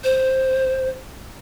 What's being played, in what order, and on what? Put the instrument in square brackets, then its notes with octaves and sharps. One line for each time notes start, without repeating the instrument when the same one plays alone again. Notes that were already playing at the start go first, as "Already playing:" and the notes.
[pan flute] C5